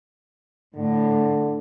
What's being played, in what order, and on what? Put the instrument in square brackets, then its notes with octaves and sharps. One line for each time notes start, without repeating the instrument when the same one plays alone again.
[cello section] A2 [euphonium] D3